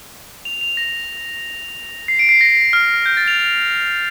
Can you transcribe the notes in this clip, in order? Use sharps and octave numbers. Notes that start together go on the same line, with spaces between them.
F7
F7
A#6
C7
D7
C7
A#6
F6
G6
A6
F7